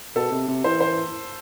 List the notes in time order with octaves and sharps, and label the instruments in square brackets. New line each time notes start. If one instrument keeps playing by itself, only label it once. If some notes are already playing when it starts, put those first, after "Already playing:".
[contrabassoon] B2 [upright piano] A4
[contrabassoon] C3
C3
[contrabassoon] E3 [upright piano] C5
[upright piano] C5